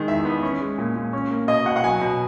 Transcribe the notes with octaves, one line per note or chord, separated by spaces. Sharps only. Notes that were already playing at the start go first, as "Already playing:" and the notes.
Already playing: D#3 G#3
E2 E5
B3
C#4
G#3
A#2
A#2
C#4
A#3
B2 D#5
B2 F#5
F#5
F#3 G#5
B2